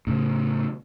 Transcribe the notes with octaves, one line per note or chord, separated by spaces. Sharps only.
A2 C#3